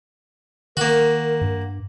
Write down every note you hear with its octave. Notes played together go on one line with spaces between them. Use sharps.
D#3 A#3 F#4 A#4
G2